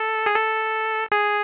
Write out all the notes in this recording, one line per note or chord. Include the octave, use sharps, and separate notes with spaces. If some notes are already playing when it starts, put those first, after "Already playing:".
Already playing: A4
G#4
A4
G#4